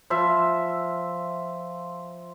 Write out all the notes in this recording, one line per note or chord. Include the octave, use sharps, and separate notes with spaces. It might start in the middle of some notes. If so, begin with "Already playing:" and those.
F3 C5 E5